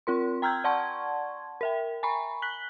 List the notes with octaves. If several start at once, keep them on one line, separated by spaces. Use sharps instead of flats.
C4 F4 A#4 C6
G5 A#5 E6 F6 G6 G#6
D5 F#5 A5 C6 C#6 G#6
A#4 E5 G5
G#5 A#5 B5 C#6
F#6 B6 F#7 G7